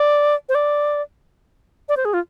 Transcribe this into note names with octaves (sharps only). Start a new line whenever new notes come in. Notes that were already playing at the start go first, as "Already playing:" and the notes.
Already playing: D5
C5
D5
D5
C5
G#4
F4